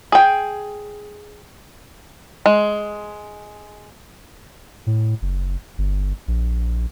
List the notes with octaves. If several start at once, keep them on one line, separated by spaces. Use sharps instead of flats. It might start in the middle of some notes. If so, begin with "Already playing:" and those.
G#4 G5
G#3
A2
F#1
G1
A#1